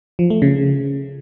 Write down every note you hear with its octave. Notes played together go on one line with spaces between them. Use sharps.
F3
A3
C#3